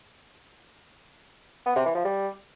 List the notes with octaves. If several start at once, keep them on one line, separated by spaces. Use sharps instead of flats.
B3
C3
E3
F3
G3